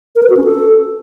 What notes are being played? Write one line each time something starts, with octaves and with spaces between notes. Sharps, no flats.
A#4
B4
F#4
C#4
A4